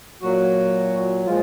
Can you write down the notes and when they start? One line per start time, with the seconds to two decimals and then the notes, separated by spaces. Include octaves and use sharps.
0.22 A#2 F#3 F#4
1.26 A#2 F3 G#3 F4